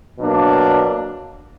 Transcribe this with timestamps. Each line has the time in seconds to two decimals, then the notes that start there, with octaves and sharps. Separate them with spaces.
0.19 B2 F#3 A#3 D4